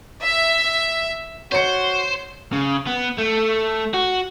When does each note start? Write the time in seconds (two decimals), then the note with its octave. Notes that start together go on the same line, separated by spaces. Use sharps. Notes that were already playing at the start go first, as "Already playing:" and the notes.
0.21 E5
1.52 F#4 C5 C#5 C#7
2.52 C#3
2.86 B3
3.18 A3
3.94 F#4